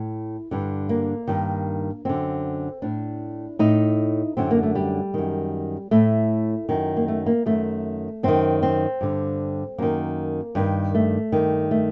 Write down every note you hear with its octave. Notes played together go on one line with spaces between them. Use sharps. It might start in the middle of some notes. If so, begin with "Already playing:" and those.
Already playing: A2
G2 D3
A#3
G2 D#3
F#2 D3 C4
A2 D4
A2 D#4
F#2 D3 C4
A#3
A3
G3
F#2 D#3
A2 A3
F#2 D#3
A#3
A3
A#3
F#2 D#3 A3
F#2 D#3 C4
C4
G2 D3
F#2 D#3 A#3
G2 D#3
A3
G2 D#3
A3